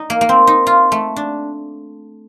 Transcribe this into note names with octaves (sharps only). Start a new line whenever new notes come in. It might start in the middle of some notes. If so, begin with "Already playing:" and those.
Already playing: D#4
A#3
A#3
C4
D#4
F4
A3
D4